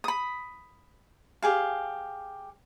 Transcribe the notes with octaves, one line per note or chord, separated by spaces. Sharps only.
B5 D#6
G4 G#4 F5